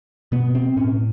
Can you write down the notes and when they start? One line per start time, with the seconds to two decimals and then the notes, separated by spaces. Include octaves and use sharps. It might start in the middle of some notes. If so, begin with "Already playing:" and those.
0.32 B2 B3
0.55 C4
0.76 A2 C#4